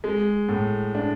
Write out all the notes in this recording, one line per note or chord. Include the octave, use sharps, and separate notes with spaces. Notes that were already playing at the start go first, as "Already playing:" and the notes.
G#3
A2
D4